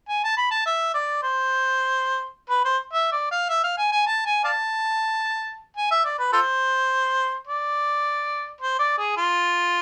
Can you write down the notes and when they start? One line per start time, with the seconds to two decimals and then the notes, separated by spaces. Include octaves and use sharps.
0.09 G#5
0.24 A5
0.37 B5
0.51 A5
0.66 E5
0.94 D5
1.23 C5
2.50 B4
2.65 C5
2.93 E5
3.12 D5
3.31 F5
3.49 E5
3.63 F5
3.78 G#5
3.92 G#5
4.07 A5
4.26 G#5
4.44 D5 F5 A5
5.77 G#5
5.91 E5
6.05 D5
6.19 B4
6.33 F4 A4 C5
7.47 D5
8.61 C5
8.79 D5
8.98 G#4
9.17 F4